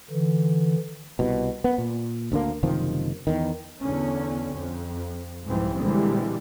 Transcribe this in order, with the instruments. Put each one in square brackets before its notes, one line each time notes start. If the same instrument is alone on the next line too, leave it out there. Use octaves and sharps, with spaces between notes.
[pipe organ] D3 E3
[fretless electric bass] C2 B2
B3
A#2
D2 D3 A#3
F#1 C3 D#3 F3
E2 D#3
[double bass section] E2 D3 C#4
F2
C2 G#2 E3 F3 G3 C4
A#2 D3 E3 G3 G#3 C4